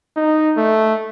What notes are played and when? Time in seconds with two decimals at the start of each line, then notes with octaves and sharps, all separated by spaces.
0.17 D#4
0.57 A3